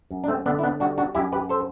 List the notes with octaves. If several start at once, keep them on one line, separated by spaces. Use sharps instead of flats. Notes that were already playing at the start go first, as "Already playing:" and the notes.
F#2
D4
A3 C4
D3 B3 D4
E4
B3 D4
G3 D4 F#4
D4 F#4
F#2 E4 G4
G4 B4
A4 C5